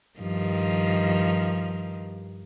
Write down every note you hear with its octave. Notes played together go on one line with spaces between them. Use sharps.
G2 D#3 F3